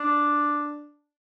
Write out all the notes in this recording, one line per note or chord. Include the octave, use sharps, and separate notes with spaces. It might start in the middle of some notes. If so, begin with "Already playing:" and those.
Already playing: D4